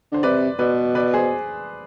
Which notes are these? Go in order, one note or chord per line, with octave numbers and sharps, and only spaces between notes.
D3 C5
C3 B4 D5
B2 B4 D5
B4 D5
G#4 C5